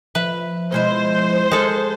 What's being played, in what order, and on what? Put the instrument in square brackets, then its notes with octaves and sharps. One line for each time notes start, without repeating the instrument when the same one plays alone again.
[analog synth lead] F3 [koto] B4 [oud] E5
[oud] B2 G#3 E4 [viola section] C5
[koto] G#3 A4 [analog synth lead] A#4